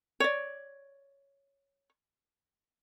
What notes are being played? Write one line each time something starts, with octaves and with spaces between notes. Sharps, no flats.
C#5 D5